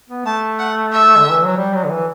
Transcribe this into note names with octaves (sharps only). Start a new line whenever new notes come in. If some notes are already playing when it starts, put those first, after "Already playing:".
B3
A3 A5
F#5
E5
D3
E3
F#3
G3
F#3
D3
E3